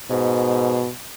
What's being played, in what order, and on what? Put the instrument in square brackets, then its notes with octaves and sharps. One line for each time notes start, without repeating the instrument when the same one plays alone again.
[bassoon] G#2 [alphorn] B2